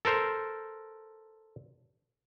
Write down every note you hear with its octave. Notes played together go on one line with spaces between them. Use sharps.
A4 A#4 C5